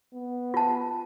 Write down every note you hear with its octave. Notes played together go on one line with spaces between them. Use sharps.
B3
F4 A5